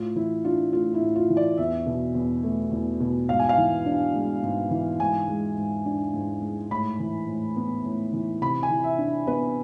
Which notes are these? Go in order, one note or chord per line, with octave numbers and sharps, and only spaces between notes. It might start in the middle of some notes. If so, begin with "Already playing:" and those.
Already playing: A2 F4
E3 E4
D4 F4
A3 F4
E4
A2
F4
E3
D5
E2 E5
B2
E2
A3
E2
B2
G#2 F5
G#5
F5
E3
D4
G#3
G#2
E3
G#2 G#5
G#3
G#2
D4
G#2
G#3
A2 B5
E3
A2
B3
A2
E3
C3 B5
G#5
E3
E5
D4
B3 B4